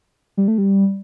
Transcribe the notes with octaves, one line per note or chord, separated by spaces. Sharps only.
G3
A3
G3